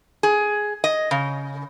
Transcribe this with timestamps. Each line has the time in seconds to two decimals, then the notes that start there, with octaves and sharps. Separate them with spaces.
0.23 G#4
0.84 D#5
1.11 C#3